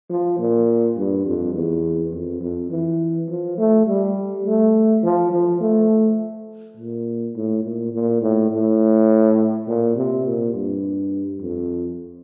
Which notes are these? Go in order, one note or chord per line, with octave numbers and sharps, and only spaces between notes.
F3
A#2
G2
F2
E2
F2
F2
E3
F3
A3
G3
A3
F3
F3
A3
A#2
A2
A#2
A#2
A2
A2
A#2
C3
A#2
G2
F2